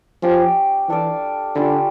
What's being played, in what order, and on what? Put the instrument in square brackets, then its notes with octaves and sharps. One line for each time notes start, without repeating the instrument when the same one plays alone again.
[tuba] F3 [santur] C#4 G4 C#5
[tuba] E3 [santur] D4 A4 D5 F5
[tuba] D3 [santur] G3 C#4 F4 C#5